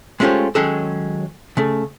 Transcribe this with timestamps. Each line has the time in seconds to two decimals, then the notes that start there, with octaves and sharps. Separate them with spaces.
0.20 G#3 A3 C#4 F4 G4 C5
0.55 D#3 F#3 G#3 C#4 G#4 A4
1.57 C#3 A3